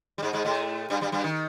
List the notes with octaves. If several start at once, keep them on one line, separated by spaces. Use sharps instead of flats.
G3
G#2 G#3
G#2 G#3
A2 A3
G2 G3
G2 G3
G2 G3
D#3